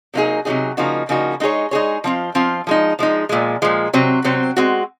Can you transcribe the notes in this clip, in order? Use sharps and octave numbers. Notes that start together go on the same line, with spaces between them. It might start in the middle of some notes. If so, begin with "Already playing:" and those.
C3 F#3 A#3 D#4 G#4
C3 F#3 A#3 D#4 G#4
C#3 F3 A#3 D#4 F#4
C#3 F3 A#3 D#4 F#4
G#3 D#4 G#4 C#5
G#3 D#4 G#4 C#5
F3 C4 F4
F3 C4 F4
F3 G#3 D#4
F3 G#3 D#4
A#2 F3 G#3
A#2 F3 G#3
C3 F#3 C4
C3 F#3 C4
G#3 C4 F#4